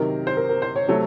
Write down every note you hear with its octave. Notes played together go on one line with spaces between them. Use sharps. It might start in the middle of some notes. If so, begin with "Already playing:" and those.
Already playing: C3 D#3 F#3 A#4
C5
A#4
A#4
C5
C#5
C3 F#3 A3 C#5